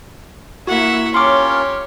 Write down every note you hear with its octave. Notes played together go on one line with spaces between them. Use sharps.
A#3 E4 F#4 E5 F#5
C#4 F4 G4 A#4 C#5 C6 D6